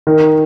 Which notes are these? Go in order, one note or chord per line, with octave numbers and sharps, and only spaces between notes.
D#3 A#4